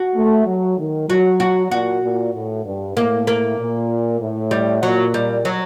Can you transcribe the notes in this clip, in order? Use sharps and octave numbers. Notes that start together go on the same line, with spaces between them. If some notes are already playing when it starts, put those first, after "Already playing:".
Already playing: F#4
A3
F#3
D#3
F#3 F#4
F#4
A#2 F#4
A#2
A2
G2
A2 A#3
A#3
A#2
A2
G3
A#2 F#3
G3
F#3